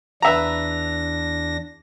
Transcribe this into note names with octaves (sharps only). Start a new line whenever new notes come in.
E2 D4 B4 E5 A#5 A#6